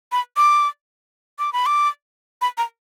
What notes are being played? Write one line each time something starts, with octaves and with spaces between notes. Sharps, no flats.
B5
D6
D6
B5
D6
B5
A#5